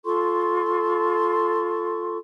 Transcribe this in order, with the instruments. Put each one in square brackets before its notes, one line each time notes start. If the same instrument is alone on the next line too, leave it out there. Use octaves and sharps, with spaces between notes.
[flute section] F4 A4 C6 C#6